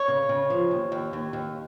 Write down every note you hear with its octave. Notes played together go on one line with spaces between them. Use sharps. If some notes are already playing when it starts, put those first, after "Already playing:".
Already playing: C#5
C#3
C#3
F3
D#2
D#2
D#2
D#2